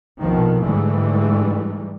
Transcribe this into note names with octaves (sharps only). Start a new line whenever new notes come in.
A#1 F2 B2 D#3 F3
G#2 D3 E3 G3 A3